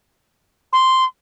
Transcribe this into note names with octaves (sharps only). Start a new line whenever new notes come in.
C6